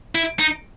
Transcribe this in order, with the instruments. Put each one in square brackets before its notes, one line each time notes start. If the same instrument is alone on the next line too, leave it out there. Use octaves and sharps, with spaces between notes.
[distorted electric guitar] E4
D#4